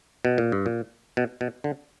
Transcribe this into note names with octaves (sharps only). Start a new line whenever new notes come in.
B2
A#2
G2
A#2
B2
B2
D3